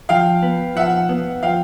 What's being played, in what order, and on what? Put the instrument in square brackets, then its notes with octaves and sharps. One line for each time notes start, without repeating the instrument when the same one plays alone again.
[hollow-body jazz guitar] F3 [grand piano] F5 G5
[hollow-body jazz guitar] B3
[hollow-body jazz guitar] F3 [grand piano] E5 F#5
[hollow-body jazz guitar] B3
[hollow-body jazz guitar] F3 [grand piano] F5 G5